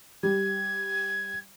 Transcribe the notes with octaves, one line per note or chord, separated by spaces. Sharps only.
G3 G#6